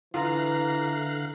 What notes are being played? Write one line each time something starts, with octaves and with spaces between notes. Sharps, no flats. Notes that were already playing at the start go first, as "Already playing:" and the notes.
D3 E3 F4 F5 A#5 F#6